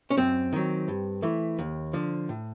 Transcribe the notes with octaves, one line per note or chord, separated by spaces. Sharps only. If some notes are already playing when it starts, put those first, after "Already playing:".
C#4
F#2 C4
D#3 F#3
G2
E3 A3
D#2
D3 F3
A2